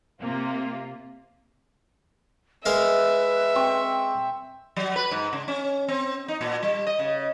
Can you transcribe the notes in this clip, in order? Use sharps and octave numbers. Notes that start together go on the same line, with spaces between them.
C3 A#3 F4
G#3 A#4 B4 E5 F5
C4 C#6
F#3
B4
G#2
C#3
C#4
C4
D#4
A#2
G3
D#5
C#3